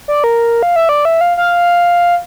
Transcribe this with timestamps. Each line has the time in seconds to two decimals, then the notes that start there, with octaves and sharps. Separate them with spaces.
0.08 D5
0.24 A#4
0.63 F5
0.76 E5
0.89 D5
1.05 E5
1.21 F5
1.37 F5